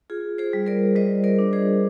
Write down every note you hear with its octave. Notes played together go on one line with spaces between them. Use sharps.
F4 G#4
G#4 C5
G3
A#4 D5
G3 C5 D#5
A#4 D5
D4
G#4 C5